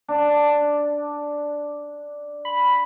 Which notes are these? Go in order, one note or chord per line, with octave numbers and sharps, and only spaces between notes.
D4
B5